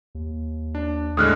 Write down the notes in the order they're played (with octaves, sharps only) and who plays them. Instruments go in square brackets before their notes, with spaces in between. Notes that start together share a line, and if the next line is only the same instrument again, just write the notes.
[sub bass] D#2
[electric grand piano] D4
[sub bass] D#2 [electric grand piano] A2 D3 G#3 [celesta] D#6 F6 F#6